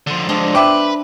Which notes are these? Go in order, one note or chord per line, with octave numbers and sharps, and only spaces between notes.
D3 F3
F3 G#3 C4 D4
B4 E5 G5 D6